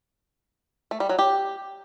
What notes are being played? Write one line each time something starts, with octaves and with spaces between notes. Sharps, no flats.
A3
G3
F#3
G4